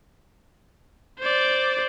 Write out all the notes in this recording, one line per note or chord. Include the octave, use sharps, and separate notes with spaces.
C5 D5